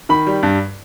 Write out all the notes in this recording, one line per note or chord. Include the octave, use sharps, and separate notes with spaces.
D#3 B5
G3
G2